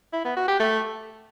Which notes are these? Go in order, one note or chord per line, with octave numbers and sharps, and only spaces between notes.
E4
B3
F#4
G4
A3